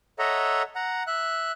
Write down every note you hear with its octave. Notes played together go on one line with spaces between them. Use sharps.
A4 C#5 D#5 E5 F#5 A#5
F#5 A#5
E5 F#6